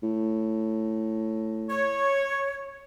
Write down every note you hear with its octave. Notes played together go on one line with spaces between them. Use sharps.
A2
C#5